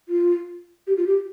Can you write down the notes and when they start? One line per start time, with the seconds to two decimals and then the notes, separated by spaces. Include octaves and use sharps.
0.09 F4
0.87 G4
0.97 F4
1.07 G4